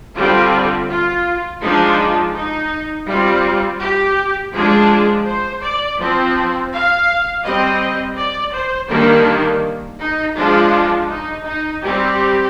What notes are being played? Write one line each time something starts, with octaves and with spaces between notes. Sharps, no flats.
D3 G3 C4 F4
F4
F3 G#3 D4 D#4
D#4
G3 C4 F4
G4
F3 G#3 D4 G#4
C5
D5
F3 C4
F5
G3 C4 D#5
D5
C5
D#3 G3 A#3 D4 A#4
D#4
F3 G#3 D4 F4
D#4
D#4
G3 C4 G4